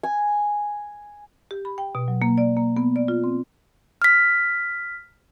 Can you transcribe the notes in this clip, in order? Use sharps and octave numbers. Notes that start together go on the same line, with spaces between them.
G#5
G4
B5
G5
B2
F#3
A#3
D5
A#3
B3
D5
F4
C4
F6 B6